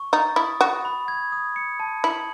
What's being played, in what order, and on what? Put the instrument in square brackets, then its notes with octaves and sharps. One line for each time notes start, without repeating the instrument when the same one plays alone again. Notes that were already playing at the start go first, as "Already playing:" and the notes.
Already playing: [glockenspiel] C#6
[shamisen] D#4 [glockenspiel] A6
[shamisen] E4 [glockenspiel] D#6
[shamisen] F#4 [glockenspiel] B5
[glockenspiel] B5
G#6
D#6
C#7
A5
[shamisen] E4 [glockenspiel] F#7